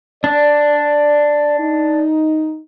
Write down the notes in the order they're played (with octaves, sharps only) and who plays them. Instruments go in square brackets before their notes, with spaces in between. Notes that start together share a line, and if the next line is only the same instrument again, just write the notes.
[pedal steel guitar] D4 [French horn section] D5
[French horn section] D#4